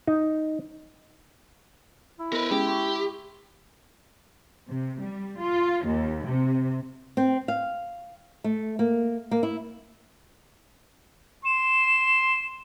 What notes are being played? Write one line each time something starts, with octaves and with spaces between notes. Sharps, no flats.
D#4
E4
B3 A#4 B4 D#5
G#3 C#4 G4 G#4
C6 C#6
C3
G3
F4
D#2
C3
C4
F5
A3
A#3
A#3
E4
C6 E7